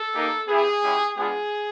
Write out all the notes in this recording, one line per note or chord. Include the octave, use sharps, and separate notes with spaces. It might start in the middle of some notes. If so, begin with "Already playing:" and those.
Already playing: A4
A#3 D#4 G4
B3 E4 G4 G#4
G#3 C#4 E4 G4
G#3 B3 D4 F4 G#4